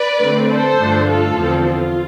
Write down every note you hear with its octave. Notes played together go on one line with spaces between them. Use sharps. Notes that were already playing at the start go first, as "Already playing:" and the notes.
Already playing: B4 D5
D3 A3 C4
A4 C5
G2 D3 F3 A3 D4
F4 A4
E2 D3 F3 C4
F4